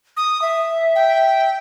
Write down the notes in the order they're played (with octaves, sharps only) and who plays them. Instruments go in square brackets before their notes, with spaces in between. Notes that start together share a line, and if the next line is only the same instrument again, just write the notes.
[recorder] D#6
E5
[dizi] G5